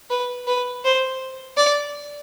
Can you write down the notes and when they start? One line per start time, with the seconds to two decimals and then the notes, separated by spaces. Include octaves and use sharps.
0.10 B4
0.47 B4
0.85 C5
1.57 D5